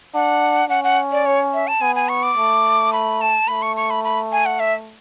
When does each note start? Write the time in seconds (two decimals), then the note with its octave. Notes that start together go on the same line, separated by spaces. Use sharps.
0.15 D4 F#5
0.69 C#4 F#5
0.84 F#5
1.12 D5
1.26 C#5
1.54 E5
1.68 A5
1.81 B3 G#5
1.96 G#5
2.09 C#6
2.23 D6
2.37 A3
2.93 B5
3.21 A5
3.48 A3 B5
3.62 C#6
3.76 C#6
3.90 B5
4.04 B5
4.32 G#5
4.46 F#5
4.60 E5